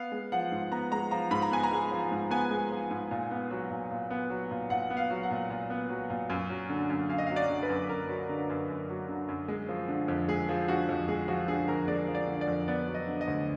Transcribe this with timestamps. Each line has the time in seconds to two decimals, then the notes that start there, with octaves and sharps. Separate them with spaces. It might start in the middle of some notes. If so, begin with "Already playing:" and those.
Already playing: B3 F5
0.12 G#3
0.32 F3 F#5
0.52 G#2
0.72 B3 A#5
0.92 G#3 A#5
1.11 F3 A#5
1.31 G#2 B5
1.42 A#5
1.51 B3 G#5
1.63 A#5
1.71 G#3
1.91 F3
2.11 G#2
2.30 B3 G#5
2.51 G#3
2.71 F3
2.91 G#2
3.11 A#2
3.31 B3
3.50 F#3
3.70 A#2
3.91 A#2
4.10 B3
4.30 F#3
4.51 A#2
4.70 A#2 F#5
4.90 B3
4.97 F5
5.10 F#3
5.23 F#5
5.30 A#2
5.50 A#2
5.70 B3
5.89 F#3
6.10 A#2
6.30 F#2
6.49 F#3
6.70 D3
6.90 F#2
7.09 F#2 F5
7.18 D#5
7.27 F#3 F5
7.36 D5
7.49 D3
7.63 B4
7.69 F#2
7.89 F#2 A#4
8.09 F#3
8.29 D3
8.50 F#2
8.69 F#2
8.89 F#3
9.09 D3
9.29 F#2
9.48 G#3
9.69 F3
9.88 D3
10.08 F2
10.28 G#3 G#4
10.49 F3 G#4
10.68 D3 F#4
10.89 F2
11.08 G#3 G#4
11.28 F3 F#4
11.48 D3 G#4
11.68 F2 A#4
11.87 G#3 D5
12.08 F3
12.15 D5
12.27 D3
12.41 D5
12.47 F2
12.68 B3 D5
12.87 F#3
12.94 D#5
13.07 D3
13.21 D#5
13.27 D2